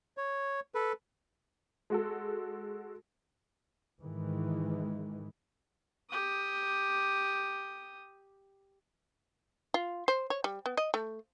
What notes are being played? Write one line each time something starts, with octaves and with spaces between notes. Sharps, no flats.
C#5
A4 B4
G#3 F#4 A4
G#2 D#3 E3 G#3
G4 D#6
F4
C5
C#5
G3
B3
D#5
A3